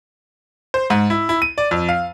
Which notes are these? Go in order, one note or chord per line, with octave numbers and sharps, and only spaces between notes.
C5
G#2
E4
E4
D#7
D5
F2
F5